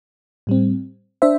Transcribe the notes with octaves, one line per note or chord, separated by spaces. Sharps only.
A2 G3 C4
D4 C5 E5